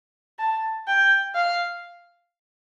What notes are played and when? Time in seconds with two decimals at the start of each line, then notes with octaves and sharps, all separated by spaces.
0.39 A5
0.88 G5
1.35 F5